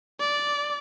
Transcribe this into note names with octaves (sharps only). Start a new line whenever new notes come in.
D5